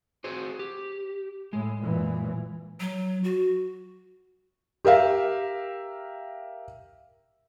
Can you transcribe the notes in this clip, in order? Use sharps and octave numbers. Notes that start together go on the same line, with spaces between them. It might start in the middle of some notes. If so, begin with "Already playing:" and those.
F#4 G#4 C5
G4
A2 G#3
F#2 A#2 E3
F#3
F#4
G4 A#4 E5 F5